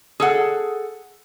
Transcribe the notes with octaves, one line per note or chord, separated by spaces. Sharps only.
G#4 A4 F#5